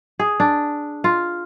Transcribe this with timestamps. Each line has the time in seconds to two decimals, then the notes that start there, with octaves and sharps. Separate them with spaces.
0.19 G#4
0.40 D4
1.04 F4